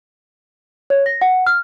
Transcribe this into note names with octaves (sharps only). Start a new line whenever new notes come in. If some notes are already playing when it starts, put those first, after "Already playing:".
C#5
A#6
F#5
F6